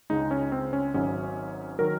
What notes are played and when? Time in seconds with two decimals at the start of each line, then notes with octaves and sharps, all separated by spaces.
0.10 C#2 C#3 G#3 D#4
0.31 C#4
0.52 C4
0.73 C#4
0.94 G#1 G#2 F#3 C#4
1.79 D#3 F#3 A#4